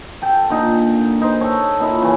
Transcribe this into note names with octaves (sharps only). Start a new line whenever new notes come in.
A4 G5
A#2 D3 A#3 D#4
D#4 C5
A4 C#5
A#2 D#4 E4
C#3 E3 C#4